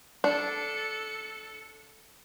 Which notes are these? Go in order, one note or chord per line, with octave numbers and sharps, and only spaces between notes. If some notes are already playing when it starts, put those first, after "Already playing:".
D4 A4 C#7